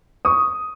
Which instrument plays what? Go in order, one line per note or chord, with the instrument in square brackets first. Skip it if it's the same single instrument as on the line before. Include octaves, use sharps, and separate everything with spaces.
[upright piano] C#6 D#6